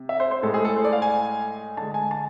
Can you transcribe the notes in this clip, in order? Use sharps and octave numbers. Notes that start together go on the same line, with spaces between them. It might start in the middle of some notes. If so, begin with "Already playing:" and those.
Already playing: C3
E5
C5
C5
A2 G#3 A4
G#4
A4
C5
D5
F5
G#5
D3 G#3 A5
G#5
A5